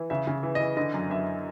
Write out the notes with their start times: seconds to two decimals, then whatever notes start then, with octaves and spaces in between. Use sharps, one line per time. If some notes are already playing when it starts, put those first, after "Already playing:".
Already playing: E3
0.10 C#3 E5
0.27 C#3
0.43 E3
0.55 E3 D#5
0.77 D3 D#5
0.94 F#2
1.10 F#2 E5